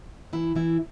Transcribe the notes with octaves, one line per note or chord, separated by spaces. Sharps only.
E3 E4
E3 E4